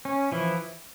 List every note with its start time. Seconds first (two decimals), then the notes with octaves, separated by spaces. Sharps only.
0.05 C#4
0.32 E3 F3 E4